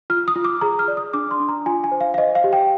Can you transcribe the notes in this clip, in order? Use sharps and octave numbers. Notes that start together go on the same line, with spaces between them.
F4 F6
D#6
F4
D6
G#4 A#5
F6
D5
D#6
D4 D6
C6
D4
A#5
F4 G#5
G#5
C5
F5
F5
C5 D#5
F5
G4
G5